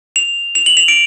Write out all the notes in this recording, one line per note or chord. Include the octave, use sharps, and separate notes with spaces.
F7
F7
F#7
F7
D7